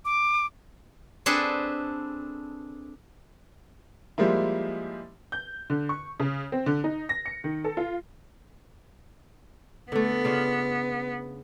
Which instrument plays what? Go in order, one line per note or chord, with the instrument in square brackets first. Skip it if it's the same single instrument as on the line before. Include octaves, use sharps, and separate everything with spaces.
[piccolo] D6
[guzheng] C4 D4 G#4 A4 B4
[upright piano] F3 G3 G#3 A#3 E4
[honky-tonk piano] G6
D3
C#6
C#3
C4
D3
D#4
A#6
C#7
D#3
A4
F4
[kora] D3 A3 [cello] B3
[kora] C#3 D4 F4